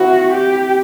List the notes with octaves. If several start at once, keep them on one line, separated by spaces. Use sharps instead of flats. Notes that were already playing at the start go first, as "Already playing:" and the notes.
Already playing: C4 E4 F#4
G4